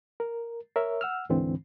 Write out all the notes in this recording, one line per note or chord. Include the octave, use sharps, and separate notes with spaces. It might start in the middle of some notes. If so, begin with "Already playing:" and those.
A#4
A#4 C#5 E5
F#5 E6 F6
D2 G#2 D3 E3 C4